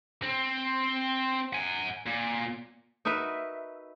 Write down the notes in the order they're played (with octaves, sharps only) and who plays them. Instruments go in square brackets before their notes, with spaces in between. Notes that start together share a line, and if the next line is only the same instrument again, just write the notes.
[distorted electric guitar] C4
F#5 G#5
A#2
[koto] D#4 F#4 A#4 B4 E5